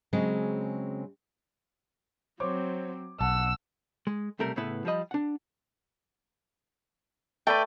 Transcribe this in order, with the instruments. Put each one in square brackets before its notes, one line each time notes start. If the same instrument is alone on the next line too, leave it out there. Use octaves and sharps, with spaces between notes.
[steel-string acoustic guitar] C#3 F#3 G#3 C4
[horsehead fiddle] F#3 C4 [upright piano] C5 C#5 D6
[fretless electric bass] B1 [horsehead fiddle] F#5 [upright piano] A5 [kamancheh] E6
[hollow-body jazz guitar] G#3
B1 C3 G3 A3 A#4
A2 C#3 B3 E4 B4
F3 G3 C5 D#5 B5
D4 F#5
[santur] A3 [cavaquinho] B4 D5 G5